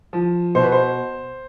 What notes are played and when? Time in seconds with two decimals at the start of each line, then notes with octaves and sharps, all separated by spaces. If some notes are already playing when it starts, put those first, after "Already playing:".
0.13 F3
0.55 B2 C5
0.63 B4
0.72 C5